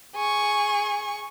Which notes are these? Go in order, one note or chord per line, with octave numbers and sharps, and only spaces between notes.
G#4 C#6